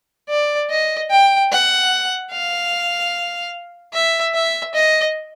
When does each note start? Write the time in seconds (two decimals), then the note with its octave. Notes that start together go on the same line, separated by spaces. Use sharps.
0.29 D5
0.70 D#5
1.10 G5
1.52 F#5
2.31 F5
3.93 E5
4.34 E5
4.74 D#5